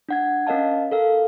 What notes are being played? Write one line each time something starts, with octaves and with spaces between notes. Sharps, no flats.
D4 F#5 G#6
C#4 A#4 D#5 F5 A5
A4 A#4 F5